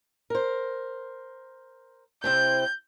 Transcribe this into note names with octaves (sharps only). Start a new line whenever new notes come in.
A#4 C5
C3 C4 E4 G6